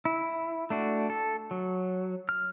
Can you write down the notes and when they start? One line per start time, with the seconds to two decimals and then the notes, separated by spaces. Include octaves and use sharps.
0.05 E4
0.70 A3 D4 F#4
1.10 A4
1.51 F#3
2.29 F6